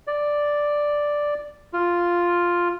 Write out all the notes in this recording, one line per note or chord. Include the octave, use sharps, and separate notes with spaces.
D5
F4